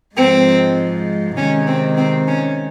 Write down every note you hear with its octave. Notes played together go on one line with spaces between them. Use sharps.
G#2 F3 G#3 C4
C3 D#3 G#3 C#4
C4
C4
C#4